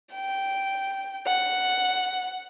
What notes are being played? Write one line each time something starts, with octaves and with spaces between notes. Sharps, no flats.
G5
F#5